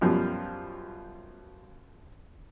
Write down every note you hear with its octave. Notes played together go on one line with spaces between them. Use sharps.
F#2 B2 F3 G3